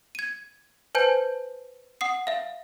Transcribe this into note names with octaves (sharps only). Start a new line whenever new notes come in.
G#6 D#7
B4 C5 G#5 A5 G6
F#5 D#6 C7
E5 F5